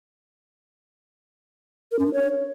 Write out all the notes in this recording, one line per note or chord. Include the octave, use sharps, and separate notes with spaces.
A#4
C#4
D4
C#5